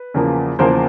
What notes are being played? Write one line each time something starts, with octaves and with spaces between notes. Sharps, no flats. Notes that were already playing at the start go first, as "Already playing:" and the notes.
Already playing: B4
E2 C#3 F3 A#3
E2 C#3 F3 A#3 A#4 C5